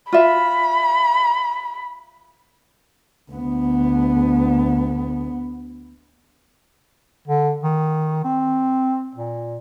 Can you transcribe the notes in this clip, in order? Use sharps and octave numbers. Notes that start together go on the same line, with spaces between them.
F4 E5 B5
D2 B3
D3
D#3
C4
A#2